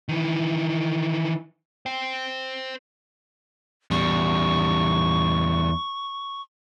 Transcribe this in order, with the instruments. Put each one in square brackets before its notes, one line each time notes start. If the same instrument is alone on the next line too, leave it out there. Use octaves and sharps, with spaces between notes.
[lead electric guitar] D#3 E3
C5 G5
[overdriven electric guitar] E2 G3 [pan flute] C#6